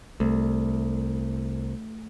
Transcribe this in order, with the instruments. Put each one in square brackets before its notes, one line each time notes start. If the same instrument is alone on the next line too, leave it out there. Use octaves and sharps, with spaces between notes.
[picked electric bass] C2 [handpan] A3